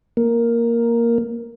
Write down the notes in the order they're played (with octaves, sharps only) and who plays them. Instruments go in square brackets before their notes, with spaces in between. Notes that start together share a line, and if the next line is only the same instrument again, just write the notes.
[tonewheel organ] A#3